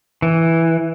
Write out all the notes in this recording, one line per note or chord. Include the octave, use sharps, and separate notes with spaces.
E3